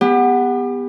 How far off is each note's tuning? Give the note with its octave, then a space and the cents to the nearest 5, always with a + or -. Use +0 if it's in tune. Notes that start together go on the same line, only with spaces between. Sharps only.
B3 +0 G4 +35